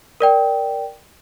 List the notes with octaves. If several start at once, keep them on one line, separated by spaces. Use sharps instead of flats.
A#4 D5 G5